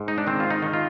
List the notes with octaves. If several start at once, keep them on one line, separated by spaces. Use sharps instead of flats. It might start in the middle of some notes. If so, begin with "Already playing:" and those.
Already playing: G#2
D#4
D4
D#3 C4
F4
D#4
D#3
F4